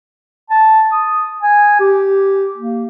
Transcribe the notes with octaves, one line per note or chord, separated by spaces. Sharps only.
A5
D#6
G#5
G4
A#3